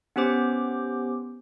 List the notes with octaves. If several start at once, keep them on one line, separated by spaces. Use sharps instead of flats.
B3 C#4 G4 C5 D6